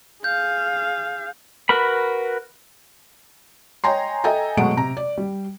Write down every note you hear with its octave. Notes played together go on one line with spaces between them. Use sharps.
G#4 F5 G6
F#4 A#4 B4 B5
C#5 D#5 G5 G#5 A#5 C6
A4 D#5 E5 G5 G#5 A#5
B2 F#3 G#3 A3 F#5 D7
C3 A#5
D5
G3